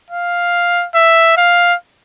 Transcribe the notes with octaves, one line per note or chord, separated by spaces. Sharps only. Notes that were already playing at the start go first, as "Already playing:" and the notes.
F5
E5
F5